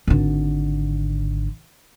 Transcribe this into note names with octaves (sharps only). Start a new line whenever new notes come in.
G#1 D3